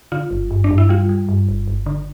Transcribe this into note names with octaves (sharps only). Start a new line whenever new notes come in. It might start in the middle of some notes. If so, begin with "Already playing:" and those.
D3 F4
G1
G2
D4
G2
E4
G3 F4
G3
G2
G1
G1
D3